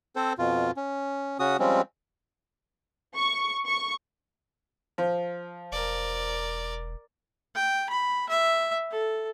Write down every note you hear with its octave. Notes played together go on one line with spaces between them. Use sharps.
C4 A4 C5
F2 B2 F4
C#4
C#3 C#4 F#4 D#6
F3 G3 G#3 C4 C#4
C#6
C#6
F3
E1 A#4 D5
G5
B5
E5
A4